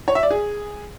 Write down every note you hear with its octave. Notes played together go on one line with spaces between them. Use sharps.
C#5
E5
D5
G#4